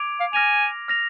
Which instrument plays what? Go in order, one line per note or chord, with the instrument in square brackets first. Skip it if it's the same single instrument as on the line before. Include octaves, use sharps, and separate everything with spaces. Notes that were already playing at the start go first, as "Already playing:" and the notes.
Already playing: [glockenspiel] D6 G#6 D7 F7
[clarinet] F5
[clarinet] G#5 [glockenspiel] F6 A#6 F7
[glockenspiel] F6 A#6 F7